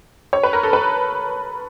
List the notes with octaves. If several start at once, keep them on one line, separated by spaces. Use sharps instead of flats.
C#5
B4
A#4
A4
B4